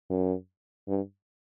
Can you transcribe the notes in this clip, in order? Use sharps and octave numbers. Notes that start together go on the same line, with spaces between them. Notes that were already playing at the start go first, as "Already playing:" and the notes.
F#2
G2